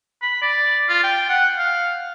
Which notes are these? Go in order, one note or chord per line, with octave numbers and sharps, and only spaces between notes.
B5
D5
F4
G5
F#5
F5